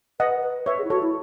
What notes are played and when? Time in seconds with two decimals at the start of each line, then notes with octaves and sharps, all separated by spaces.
0.20 B4 D#5 F#5
0.43 B4
0.66 B4 C#5 E5
0.78 G#4
0.84 E4
0.90 F#4 A4 C#5
1.02 E4